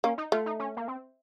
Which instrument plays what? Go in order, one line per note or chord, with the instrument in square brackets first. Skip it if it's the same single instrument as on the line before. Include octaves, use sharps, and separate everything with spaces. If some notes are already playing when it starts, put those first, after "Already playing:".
[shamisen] A#3 [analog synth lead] C#4
[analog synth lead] D#4
[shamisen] A3 [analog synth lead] F4
[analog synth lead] D#4
C#4
A#3
C4